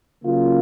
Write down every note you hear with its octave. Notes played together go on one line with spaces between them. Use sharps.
C#3 F#3 A#3 F4